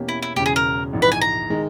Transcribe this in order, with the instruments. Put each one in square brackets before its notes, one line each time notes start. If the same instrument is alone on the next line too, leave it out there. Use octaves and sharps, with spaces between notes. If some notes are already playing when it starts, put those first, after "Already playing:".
Already playing: [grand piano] E2 B2 A#3 C#4 G4
[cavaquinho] E4
E4
[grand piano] E1 E2 C#3 [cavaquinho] G4
[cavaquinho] G#4
A#4
[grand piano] A#1 G#2 E3
[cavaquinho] B4
G#5
A#5
[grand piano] D#3 G#3